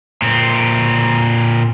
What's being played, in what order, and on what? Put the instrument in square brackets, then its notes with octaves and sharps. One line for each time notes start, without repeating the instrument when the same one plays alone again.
[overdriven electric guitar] A#2 C4